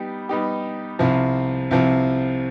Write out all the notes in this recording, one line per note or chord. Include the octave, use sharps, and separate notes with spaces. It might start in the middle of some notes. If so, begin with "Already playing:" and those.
Already playing: G3 B3 D#4 G4
G3 B3 D#4 G4
C2 C3 F3
C2 C3 F3